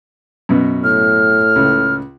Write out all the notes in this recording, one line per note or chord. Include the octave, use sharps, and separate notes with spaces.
F#2 B2
A2 F6
C#2